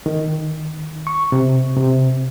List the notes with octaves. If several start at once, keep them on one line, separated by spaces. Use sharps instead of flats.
D#3
C#6
C3
C3